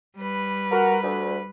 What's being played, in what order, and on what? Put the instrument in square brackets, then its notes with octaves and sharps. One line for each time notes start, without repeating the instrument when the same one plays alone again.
[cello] G3 B4
[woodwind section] F#4 A#4
D2